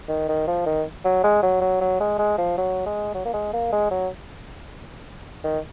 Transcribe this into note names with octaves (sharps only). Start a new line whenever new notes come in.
D#3
D#3
F3
D#3
F#3
G#3
F#3
F#3
F#3
G#3
G#3
F3
F#3
G#3
F#3
A#3
G#3
A#3
G#3
F#3
D#3